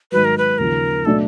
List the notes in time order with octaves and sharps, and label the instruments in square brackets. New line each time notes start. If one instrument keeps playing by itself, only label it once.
[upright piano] G#2 D#3 F#3 [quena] B4
[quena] A#4
B4
[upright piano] D#2 C#3 F3 [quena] A#4
[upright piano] B2 F#3 A3 D4 [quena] A4